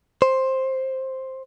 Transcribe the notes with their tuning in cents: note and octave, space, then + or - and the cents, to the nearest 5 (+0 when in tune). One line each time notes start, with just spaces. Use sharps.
C5 +10